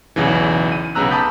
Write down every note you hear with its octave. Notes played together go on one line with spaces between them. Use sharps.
B1 E2 C#3 E3
D#7
B1 C#3 B3 A#5 E6 F#6
A5 B5 D6 D#6 G6 B6